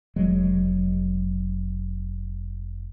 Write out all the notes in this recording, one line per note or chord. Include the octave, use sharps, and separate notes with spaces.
F1 F#3 G#3